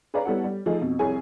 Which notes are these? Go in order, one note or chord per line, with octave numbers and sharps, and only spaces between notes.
G#4 B4 C#5 D5 F5 A#5
G3 B3 E4 A4 C#5 F#5
G3
F3 A3 D#4 G#4 A4
F2 B2
C2 F2 E4 G#4 C#5 G#5